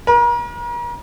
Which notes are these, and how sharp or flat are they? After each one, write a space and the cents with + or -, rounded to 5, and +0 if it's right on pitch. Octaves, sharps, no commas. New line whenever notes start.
A#4 +40